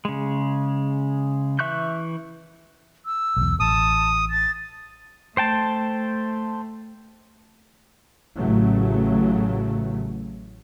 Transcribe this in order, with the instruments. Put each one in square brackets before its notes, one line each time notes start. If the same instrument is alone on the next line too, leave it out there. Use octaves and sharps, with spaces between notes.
[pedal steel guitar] C#3 G#3
E3 E5 C#6 F#6 G6
[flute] E6
[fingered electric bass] B1 E2
[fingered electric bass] A1 [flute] A5 [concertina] D#6
[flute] A6
[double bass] A3 [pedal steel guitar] C5 G5 A5
[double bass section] A1 C#3 F#3 A3